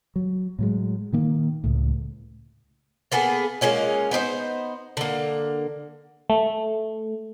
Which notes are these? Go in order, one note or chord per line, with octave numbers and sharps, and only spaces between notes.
F#3
A2 F#3 G#3
A#2 D#3 A#3
C#2 A2
A#3 B3 G#4 A4
G#3 A#3 C#4 F4
B3 D#4 G4 C5
D3 A#3
A3